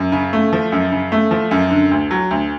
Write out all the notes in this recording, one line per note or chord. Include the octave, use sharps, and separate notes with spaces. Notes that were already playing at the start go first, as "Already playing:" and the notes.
Already playing: F#2
C#3
A3
F3
F#2
C#3
A3
F3
F#2
D3
D2
F#3
D2